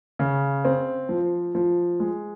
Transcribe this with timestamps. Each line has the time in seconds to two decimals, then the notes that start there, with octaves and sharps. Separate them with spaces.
0.19 C#3
0.65 C4
1.09 F3
1.55 F3
2.00 G#3